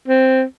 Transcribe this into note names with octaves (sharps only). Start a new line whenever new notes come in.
C4